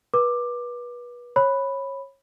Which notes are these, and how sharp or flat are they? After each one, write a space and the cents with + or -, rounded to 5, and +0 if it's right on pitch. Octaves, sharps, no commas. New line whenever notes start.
B4 -30 D6 +10
C#5 -25 B5 +0